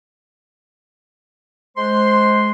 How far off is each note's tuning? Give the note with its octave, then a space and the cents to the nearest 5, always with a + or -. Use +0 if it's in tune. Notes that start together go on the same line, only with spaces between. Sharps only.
G#3 +25 C5 +0 C6 +0